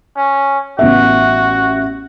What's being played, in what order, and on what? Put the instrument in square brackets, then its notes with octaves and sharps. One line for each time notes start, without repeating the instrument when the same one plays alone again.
[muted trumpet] C#4
[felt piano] A1 B3 E5 [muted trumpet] F#4